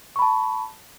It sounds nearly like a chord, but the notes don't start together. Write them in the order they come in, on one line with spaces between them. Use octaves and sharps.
C#6 B5 A5